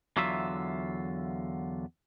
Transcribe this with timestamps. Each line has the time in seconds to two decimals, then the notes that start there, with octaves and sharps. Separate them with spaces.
0.17 E2 D3 F#3 F4 E5